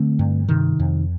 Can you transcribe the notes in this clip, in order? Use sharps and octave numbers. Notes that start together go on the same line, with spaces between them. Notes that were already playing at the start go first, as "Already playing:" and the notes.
Already playing: D3 A3 C4
G2
C3 D#3
F2